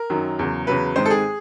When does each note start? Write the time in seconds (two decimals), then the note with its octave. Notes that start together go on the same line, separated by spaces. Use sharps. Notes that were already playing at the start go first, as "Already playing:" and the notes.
Already playing: A#4
0.10 F#2 D#3 F#3
0.39 E2 C#3 F#3
0.67 E2 C#3 F#3 B4
0.96 G#2 D#3 G#3 C4 C5
1.06 A4
1.10 G#4